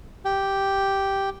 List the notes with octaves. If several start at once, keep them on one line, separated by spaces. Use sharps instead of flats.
G4